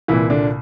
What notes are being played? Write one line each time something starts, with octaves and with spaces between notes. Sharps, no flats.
C2 A#2 E3 E4
D3 D4